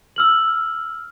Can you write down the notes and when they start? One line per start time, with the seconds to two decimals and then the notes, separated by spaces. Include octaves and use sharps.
0.16 E6 F6 F#7